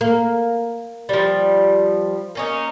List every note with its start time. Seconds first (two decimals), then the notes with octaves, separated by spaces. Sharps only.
0.01 A#3
1.09 F3 G3
2.35 A#3 C#4 D#4